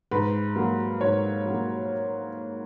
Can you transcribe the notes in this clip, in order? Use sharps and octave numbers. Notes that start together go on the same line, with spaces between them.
G#2 B4
F#3 A#3
G#2 C#5
F#3 A#3